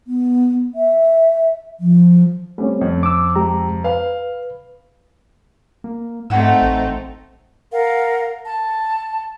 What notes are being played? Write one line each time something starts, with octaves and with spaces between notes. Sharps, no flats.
B3
E5
F3
G3 A3 C4 C#4
F2
D6 E6
G#3 G4 A#5
B4 F5
A#3
G#2 A3 C4 D#4 F#5 G5 E6
A1
A#4 F5 F#5
A5